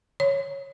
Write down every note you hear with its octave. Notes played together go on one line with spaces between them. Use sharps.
C#5